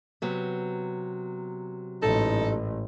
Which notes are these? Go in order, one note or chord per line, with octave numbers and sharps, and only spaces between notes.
C3 F#3 B3
A1 G#2 D#4 A4